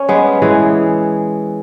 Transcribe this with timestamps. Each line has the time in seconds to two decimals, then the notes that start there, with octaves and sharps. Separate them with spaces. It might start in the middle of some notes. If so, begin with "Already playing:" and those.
Already playing: C#4
0.09 G#3 B3
0.42 E3 G#3